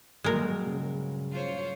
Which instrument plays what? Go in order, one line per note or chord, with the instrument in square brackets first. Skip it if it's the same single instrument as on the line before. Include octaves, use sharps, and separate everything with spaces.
[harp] G2 A#2 F#3 [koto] G#3 A#4
[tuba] C#3
[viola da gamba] F4 C5 C#5